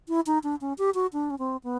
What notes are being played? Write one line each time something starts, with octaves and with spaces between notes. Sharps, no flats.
E4
D#4
D4
C#4
G4
F#4
D4
C#4
C4
B3